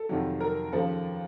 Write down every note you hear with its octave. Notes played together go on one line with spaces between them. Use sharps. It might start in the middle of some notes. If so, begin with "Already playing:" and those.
Already playing: A4
F2 C3 D#3 F#3
A#4
D#2 C#3 F3 A4